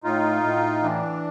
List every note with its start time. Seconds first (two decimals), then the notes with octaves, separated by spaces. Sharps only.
0.04 A2 D#4 F4
0.43 A2
0.83 E3 D4